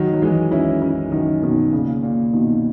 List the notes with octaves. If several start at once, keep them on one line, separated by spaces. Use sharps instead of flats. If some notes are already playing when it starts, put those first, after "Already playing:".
Already playing: D#3 F#3
F#3
E3 G#3
C#4 E4
C#4 E4
D#3 F#3
B2 D#3
A#2 C#3
A#2
B2 D#3